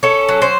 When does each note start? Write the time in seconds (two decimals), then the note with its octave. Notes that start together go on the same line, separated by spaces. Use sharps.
0.03 C#4 A4
0.29 F#3
0.42 C5